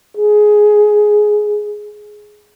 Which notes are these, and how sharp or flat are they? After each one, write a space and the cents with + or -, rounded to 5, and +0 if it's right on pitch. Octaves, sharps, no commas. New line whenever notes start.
G#4 +10